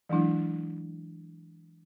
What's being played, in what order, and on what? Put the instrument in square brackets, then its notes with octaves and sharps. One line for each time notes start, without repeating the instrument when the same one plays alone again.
[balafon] E3 F#3 G#3 D4 E4